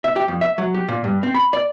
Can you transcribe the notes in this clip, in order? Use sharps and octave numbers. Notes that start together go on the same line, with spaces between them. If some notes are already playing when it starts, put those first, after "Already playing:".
E5
G4
F2
E5
F#3
G4
A#2
G2
C4
B5
D5